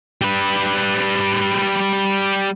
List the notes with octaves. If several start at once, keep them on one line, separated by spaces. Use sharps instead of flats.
G3 B4